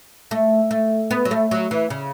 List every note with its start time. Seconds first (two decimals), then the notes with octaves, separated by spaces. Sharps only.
0.31 A3
0.71 A3
1.11 B3
1.25 F#3
1.31 A3
1.51 F#3
1.71 E3
1.90 C#3